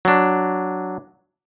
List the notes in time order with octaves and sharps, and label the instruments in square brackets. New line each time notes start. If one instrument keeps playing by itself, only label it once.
[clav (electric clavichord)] F#3 D4